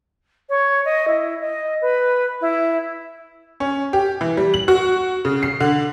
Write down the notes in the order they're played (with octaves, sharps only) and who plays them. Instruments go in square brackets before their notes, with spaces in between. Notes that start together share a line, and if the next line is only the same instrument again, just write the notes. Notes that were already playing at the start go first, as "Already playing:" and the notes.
[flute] C#5
D#5
E4
D#5
B4
E4
[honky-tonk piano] C#4
G4
E3
G3
F#7
F#4
C#3
C7
D3